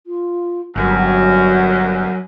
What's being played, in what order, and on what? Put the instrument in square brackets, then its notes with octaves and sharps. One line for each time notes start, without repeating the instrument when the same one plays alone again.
[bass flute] F4
[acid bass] G1 [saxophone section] F#2 [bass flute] F#3